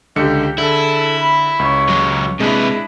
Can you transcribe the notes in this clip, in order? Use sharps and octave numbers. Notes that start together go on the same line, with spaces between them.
C#2 D3 G4 C#7
D3 E4 G#4 A4
B5
C#2 C#5
F#3 G#3
C3 G#3 D4 E4 B4 D#7